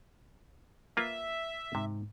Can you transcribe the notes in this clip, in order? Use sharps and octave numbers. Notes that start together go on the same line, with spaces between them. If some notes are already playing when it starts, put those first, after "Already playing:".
A#3 F4 B4 E5
G#2 C3